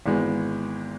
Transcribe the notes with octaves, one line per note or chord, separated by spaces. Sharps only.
G#1 G#2 E3 G#3 B3